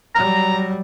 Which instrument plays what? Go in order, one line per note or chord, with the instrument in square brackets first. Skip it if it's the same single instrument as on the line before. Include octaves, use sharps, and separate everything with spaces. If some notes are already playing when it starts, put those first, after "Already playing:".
[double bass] F#3 G3 [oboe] A#5